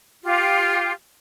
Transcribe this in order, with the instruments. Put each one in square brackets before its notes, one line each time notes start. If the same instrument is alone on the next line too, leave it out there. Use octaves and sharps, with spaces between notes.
[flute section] F4 G4